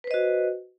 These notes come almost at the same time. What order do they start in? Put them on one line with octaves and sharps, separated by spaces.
B4 C5 D#5 F#4